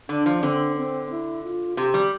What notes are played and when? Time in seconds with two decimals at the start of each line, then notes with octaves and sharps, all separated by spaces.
0.09 D3 D4
0.26 F3
0.42 D3 C4
0.76 C4
1.11 E4
1.44 F4
1.77 C3 G4
1.94 G3